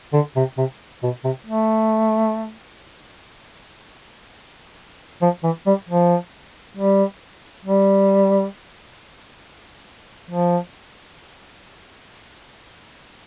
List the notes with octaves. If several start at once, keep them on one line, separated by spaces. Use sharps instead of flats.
D3
C3
C3
B2
C3
A3
F3
E3
G3
F3
G3
G3
F3